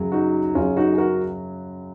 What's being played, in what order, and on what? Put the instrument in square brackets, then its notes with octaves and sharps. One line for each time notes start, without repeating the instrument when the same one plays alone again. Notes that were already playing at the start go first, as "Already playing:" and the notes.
Already playing: [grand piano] F#2 C#3 F#3
[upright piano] D#4 F#4
[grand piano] F#2 C#3 F#3 [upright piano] C#4 F4
[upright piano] D#4 F#4
G#4
F#4 A#4